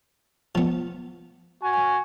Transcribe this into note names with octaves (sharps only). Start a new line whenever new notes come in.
F3 B3
F#4 G#5